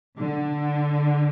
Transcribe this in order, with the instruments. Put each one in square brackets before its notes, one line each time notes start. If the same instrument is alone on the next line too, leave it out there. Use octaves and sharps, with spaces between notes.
[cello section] D3